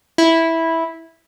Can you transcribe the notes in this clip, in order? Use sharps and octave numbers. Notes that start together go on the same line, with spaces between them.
E4